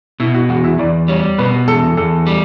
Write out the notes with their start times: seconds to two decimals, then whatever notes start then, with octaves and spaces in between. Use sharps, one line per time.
0.20 B2 E4
0.34 F#4
0.49 E2 F#4
0.64 E4
0.79 E2 D5
1.08 G3 C#5
1.38 B2 B4
1.68 E2 A4
1.97 E2 A4
2.27 G3